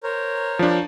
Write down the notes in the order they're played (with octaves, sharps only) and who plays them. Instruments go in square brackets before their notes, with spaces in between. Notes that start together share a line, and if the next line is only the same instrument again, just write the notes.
[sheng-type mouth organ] A#4 C5 C#5
[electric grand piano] F3 D4